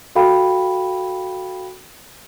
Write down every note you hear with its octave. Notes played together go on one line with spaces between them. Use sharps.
F#4 A4 F5 G5 B5